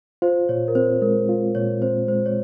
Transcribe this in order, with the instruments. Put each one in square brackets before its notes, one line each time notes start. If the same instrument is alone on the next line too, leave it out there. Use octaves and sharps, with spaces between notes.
[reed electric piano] F4 [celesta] C5
[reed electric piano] A#2 [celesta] C#5
[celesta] A#4
[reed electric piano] C4 [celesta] C5
[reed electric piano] G#3 [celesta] A#4
[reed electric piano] F4
[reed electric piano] A#2 [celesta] C#5
[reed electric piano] C4 [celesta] C5
[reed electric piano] G#3 [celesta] C5
[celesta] C#5